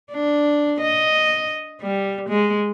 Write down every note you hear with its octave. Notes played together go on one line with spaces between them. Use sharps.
D4
D#5
G3
G#3